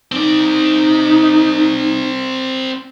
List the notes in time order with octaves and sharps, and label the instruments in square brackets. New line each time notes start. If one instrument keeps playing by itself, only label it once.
[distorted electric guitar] C4 D5 [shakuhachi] D#4